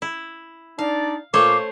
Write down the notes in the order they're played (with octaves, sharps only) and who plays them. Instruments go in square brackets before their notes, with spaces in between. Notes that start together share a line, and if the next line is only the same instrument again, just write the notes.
[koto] E4
[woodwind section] D4 D#4 D5 [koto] F5
[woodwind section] A#2 F5 [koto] A3 C5 C#5 [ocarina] D6